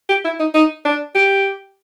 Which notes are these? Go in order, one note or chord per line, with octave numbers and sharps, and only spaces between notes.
G4
E4
D#4
D#4
D4
G4